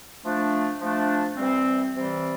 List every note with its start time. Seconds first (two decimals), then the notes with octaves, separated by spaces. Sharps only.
0.24 F3 A3 D4
0.80 F3 A3 D4
1.37 C3 E3 G3 C4
1.93 C3 E3 G3 C4